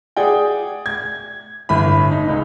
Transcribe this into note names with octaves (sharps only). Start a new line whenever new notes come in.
G#4 D5 F#5 G5
G#6
G1 A2 B5
D#4
C#2 D#4